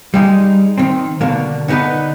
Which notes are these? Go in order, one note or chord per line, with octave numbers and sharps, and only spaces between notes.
G3 G#3 D#4
D#3 C4
B2 D3 A#3
D3 B3 D#4 G4 B4